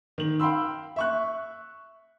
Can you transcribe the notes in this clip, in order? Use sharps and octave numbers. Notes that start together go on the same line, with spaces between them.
D#3 F#7
F5 G5 B5 C6 E6
E5 C#6 F#6